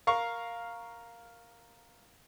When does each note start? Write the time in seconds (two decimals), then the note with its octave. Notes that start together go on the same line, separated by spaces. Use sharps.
0.07 A#4 F5 C#6